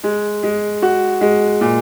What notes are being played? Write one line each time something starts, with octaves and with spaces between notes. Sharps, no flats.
G#3
G#3
F#4
G#3
A#2